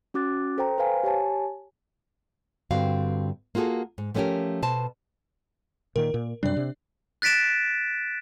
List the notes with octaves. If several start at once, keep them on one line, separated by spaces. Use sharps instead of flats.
C#4 F#4 D6 F#6 A6
A4 C5 G5 A#5
B4 C5 F5 G#5
G4 C#5 G#5 A5
G2 D3 C4 F#4 F5
A#3 F4 F#4 G#4 A4
G#2
F3 A3 B3 C#4 G4 A#4
B2 C5 A5
A#2 D#3 A#4
A#2
F#2 C3 G3 D4 D5
C3
F#6 A6 B6 D7 E7